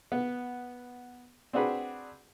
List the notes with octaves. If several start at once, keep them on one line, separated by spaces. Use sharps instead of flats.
B3
C4 D4 F#4 G#4 B4